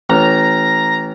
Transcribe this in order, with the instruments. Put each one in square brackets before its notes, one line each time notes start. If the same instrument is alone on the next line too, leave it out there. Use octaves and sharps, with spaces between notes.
[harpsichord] A1 [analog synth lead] A#5